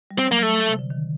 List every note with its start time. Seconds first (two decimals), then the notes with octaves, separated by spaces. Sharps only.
0.11 G3
0.18 C4
0.26 F#3
0.32 A#3
0.43 A3
0.68 C3
0.79 D3
0.90 D#3